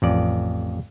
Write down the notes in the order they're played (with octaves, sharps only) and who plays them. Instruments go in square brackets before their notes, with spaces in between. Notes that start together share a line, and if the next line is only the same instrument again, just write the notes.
[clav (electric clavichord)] A1 F2 D5